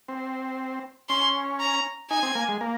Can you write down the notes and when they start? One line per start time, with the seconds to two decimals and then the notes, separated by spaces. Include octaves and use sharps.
0.08 C4
1.09 C#4 C6
1.60 A#5
2.10 D#4 G#5
2.23 C4
2.35 A#3
2.49 G#3
2.61 A#3